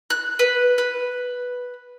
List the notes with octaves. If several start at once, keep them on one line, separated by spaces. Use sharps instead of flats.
F#6
B4
B4